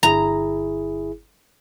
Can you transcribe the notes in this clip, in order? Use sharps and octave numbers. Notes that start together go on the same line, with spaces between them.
G1 E4 G#4 A#5